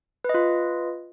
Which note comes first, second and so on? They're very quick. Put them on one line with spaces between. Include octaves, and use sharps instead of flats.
B4 D#5 F4